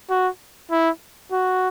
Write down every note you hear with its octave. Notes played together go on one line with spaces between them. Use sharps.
F#4
E4
F#4